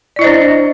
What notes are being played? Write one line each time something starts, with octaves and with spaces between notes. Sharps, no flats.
D4 E4 C5 D5 D#5